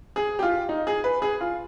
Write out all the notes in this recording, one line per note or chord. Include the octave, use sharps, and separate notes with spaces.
G#4
G4
F4
D#4
G#4
B4
G#4
F4